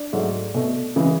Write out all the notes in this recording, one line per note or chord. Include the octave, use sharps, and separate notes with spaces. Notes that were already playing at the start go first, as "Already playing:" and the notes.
Already playing: D4
G#2 F#3 A3
B2 A3
C#3 E3 G#3